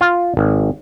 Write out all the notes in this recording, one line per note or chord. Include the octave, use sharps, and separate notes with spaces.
F4
G#1